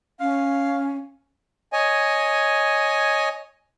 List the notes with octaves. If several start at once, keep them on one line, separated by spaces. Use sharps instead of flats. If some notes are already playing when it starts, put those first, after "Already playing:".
C#4 F5
C#5 D#5 G#5